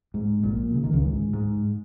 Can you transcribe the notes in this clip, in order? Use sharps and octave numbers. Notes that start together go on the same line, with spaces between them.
G#2
A#1 A#2
C#3
D#3
C#2 C#3
G#2
G#2